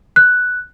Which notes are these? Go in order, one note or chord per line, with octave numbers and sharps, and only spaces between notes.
F#6